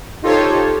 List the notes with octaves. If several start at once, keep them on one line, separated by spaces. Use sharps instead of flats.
D#4 F4 G4 A4 C5 C#5